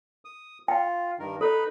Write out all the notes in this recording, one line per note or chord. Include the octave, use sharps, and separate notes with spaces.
D#6
F4 G5
G2 D#3 A#4
D#4 A4 B4 B5